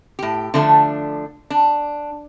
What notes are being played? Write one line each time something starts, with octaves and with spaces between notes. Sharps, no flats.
A2 G4
D3 F3 A3 D4
D4